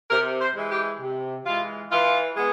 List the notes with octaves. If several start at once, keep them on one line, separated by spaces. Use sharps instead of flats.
C3 A#4
C5
E3 G#3
G4
C3
E3 G#3 F4
E3 F4
G#3 B3